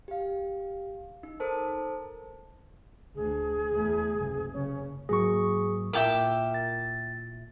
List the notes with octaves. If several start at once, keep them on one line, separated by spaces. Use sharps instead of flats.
G4 F5
D#4
A4 A#4 C5 A5
D2 D3 G#4
E2 A3
F#1 C2
F#1 C#3 C#4
G#2 F#3 A#3 G#4 C#6
A#2 E4 A#4 E5 G5 A5 D6
A6